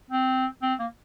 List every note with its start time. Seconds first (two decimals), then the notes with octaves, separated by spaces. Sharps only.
0.11 C4
0.62 C4
0.79 A#3